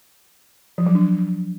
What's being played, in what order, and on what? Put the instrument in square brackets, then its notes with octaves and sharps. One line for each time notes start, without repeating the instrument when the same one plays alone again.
[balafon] F3
F#3
D4